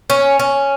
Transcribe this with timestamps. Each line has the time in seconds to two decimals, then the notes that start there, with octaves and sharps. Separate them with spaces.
0.10 C#4
0.39 C#4